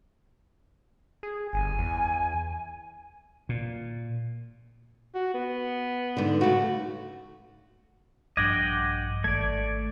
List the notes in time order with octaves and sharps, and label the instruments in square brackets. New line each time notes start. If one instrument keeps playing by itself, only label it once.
[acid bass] G#4
[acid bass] G1 [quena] G#5
[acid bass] E2
[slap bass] A#2
[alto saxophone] F#4
B3
[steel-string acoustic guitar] G#2 D3
[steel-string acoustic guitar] C#3 A3 [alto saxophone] F#4
[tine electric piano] A#1 G2 [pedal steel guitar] D#5 F#5 G5 [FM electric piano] D6 G#6 A#6
[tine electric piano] G#1 [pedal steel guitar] A3 D5 [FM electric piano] G#6